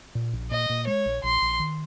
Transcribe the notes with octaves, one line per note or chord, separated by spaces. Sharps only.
A#2
A#1
A#2 D#5
A#2
G#3 C#5
A#1
A#1 C6
A#1
D#3